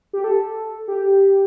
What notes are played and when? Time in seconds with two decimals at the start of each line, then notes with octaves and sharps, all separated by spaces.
0.13 G4
0.24 A4
0.88 G4